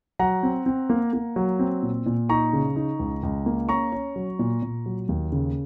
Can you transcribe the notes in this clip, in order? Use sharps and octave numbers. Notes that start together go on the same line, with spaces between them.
F#3 F#5 A#5
C4
C4
A#3
A#3
F#3
C4
A#2
A#2
D#4 A#5 C#6
C#3
D#4
C#2
C#2
A#3
C#4 A#5 C#6
C#4
F#3
A#2
A#2
F#3
D#2
C#3